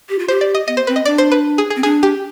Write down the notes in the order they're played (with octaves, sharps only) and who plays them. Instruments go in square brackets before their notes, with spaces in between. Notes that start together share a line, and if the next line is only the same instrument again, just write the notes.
[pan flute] G4
F4
[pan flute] G4 [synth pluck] C5
[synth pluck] D5
D#5
[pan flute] B3 [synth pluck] D#5
[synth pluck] C5
[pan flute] C4 [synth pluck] B4
[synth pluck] D#5
[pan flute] D4 [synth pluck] D5
[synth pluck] C5
B4
G#4
G#4
[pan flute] C4
[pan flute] D4 [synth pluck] G#4
[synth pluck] G4